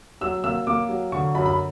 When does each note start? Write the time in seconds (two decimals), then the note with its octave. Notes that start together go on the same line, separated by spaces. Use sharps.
0.21 F#3 E6
0.44 A#3 E6
0.67 A#3 D6
0.89 F#3
1.12 D3 C#6
1.35 F#2 B5
1.46 B5